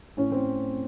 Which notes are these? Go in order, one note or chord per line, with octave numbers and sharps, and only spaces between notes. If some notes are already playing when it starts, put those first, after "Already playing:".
A2 A3 C#4
C4